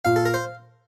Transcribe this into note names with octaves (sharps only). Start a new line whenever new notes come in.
A#2 F5
A4
A#4
C5